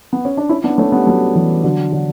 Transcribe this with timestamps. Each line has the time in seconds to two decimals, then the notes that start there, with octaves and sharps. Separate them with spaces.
0.13 B3
0.25 C#4
0.37 D4
0.49 C#4 E4
0.64 B3 D4
0.78 A3 C#4
0.92 G3 B3
1.07 F#3 A3
1.35 E3 G3
1.64 D3 F#3
1.92 D3 F#3